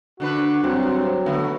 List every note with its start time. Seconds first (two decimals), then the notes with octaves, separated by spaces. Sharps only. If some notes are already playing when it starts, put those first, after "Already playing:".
0.20 D3 D4 F#4 B4
0.64 G2 F#3 C4
1.26 D3 A3 B3 D#4